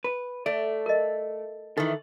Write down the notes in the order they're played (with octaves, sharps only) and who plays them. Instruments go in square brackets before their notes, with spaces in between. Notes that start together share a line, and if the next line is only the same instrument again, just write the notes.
[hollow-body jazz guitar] B4
[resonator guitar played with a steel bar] A3 [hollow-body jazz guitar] D5
[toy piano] A#4 D#5
[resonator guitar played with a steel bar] D#3 E3 [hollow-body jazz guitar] A4